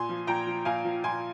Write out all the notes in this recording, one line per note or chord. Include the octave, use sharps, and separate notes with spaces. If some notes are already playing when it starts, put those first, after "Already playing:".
Already playing: A#2 G#5 C6
F3
A#2 G5 A#5
F3
A#2 F5 G#5
F3
A#2 G#5 C6